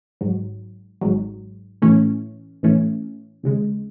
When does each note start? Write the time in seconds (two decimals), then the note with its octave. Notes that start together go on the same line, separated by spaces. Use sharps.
0.21 G#1 G#2 F#3
1.01 G#1 G#2 F#3
1.82 A2 E3 A3 C#4
2.63 A2 E3 A3 C#4
3.43 D#2 C#3 G#3